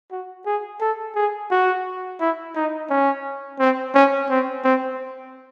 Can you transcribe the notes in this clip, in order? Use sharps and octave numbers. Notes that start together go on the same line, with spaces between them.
F#4
G#4
A4
G#4
F#4
E4
D#4
C#4
C4
C#4
C4
C4